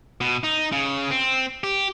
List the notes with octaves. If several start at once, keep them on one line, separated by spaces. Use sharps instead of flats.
B2
D#4
C#3
C4
G4